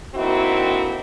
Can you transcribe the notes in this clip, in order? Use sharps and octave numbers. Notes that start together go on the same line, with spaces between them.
D3 A#3 C4 D#4 E4 F#4